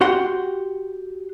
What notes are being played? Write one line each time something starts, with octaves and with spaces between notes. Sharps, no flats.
F#4 G4 F#5 C6